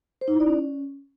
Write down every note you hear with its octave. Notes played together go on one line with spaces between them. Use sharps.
C5
D#4
E4
D5
C#4